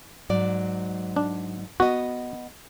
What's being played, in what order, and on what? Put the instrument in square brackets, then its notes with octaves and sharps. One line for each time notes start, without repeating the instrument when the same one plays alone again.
[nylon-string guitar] G#2 F#3 D5
[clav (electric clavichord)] D4
[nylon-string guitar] B3 D#5 [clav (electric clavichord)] F#4